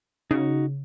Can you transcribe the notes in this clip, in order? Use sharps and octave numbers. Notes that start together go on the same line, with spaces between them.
C#3 D#4 F#4